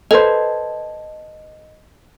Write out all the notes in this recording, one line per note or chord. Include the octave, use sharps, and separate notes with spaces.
A4 B4 C5 D#5